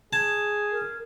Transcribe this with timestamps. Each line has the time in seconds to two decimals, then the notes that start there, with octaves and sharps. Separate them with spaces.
0.13 G#4 A5 G#6
0.72 A#4